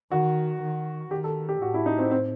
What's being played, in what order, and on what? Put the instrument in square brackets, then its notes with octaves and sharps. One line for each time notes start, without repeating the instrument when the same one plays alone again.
[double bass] D#3 [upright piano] F#4
[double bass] D#3
[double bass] D#3 [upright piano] G4
[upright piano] A4
G4
[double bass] A2 [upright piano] F#4
[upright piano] E4
D#4
C4
C4